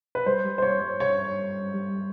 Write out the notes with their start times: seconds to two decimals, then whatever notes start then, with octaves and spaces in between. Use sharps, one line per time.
0.15 B4
0.26 G3 C5
0.44 G3
0.58 C5
0.62 C#5
0.81 G3
1.00 C#5
1.74 G3